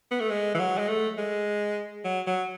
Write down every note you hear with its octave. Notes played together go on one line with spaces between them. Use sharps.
B3
A3
G#3
E3
F#3
G#3
A3
G#3
F#3
F#3